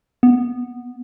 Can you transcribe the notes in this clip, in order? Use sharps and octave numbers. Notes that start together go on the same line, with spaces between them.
B3